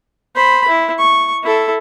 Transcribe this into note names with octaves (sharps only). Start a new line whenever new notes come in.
C5 B5
E4
C#6
E4 A4